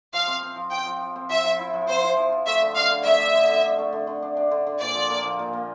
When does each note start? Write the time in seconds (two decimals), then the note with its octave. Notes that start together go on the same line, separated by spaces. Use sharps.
0.13 F3 F5
0.28 C4
0.43 C4
0.56 F3
0.71 F3 G5
0.86 F3
1.01 F3
1.16 C4
1.30 F3 E5
1.44 F3
1.59 E4
1.73 F3
1.88 C4 C5
2.03 E4
2.17 F3
2.32 F3
2.47 A3 E5
2.61 D3
2.76 D4 F5
2.91 D3
3.05 A3 E5
3.19 D4
3.35 D3
3.49 D3
3.63 D4
3.78 A3
3.93 D3
4.07 D3
4.22 D4
4.37 D4
4.51 D3
4.67 D3
4.81 A#2 D5
4.95 F3
5.10 A#3
5.24 F3
5.39 A#2
5.53 A#3